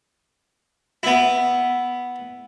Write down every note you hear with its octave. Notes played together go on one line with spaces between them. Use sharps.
B3 E4